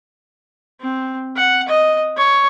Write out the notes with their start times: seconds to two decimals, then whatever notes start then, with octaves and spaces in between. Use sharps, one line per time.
0.81 C4
1.36 F#5
1.68 D#5
2.17 C#5